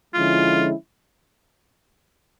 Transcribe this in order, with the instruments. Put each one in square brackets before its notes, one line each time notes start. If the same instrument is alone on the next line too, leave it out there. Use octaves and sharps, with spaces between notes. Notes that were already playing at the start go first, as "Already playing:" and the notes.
[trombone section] D3 F3 G#3 C#4 E4 [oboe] F4